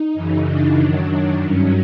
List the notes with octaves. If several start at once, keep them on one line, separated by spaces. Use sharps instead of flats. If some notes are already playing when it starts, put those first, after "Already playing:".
Already playing: D#4
F#2 C#3 E3
D4
F#2 D#3 F#3
G2 D#3 F#3 C#4